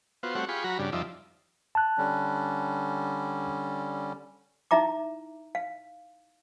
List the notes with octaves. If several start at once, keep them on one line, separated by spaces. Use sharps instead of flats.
B3 F4 F#4 C5
G3 A3 C4 F#4 C#5 F#5
F4 G4 G#4 B5 C#6
F#3 F#4 A#5 B5
G2 C#3 G3 D4
F2 F3 G3 D#4 D5 E5
A5 F#6
D3 G3 C#4
D#4 E4 E5 A#5 D6
F5